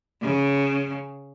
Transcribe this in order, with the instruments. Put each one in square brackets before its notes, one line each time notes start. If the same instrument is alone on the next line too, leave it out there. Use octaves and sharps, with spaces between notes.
[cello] C#3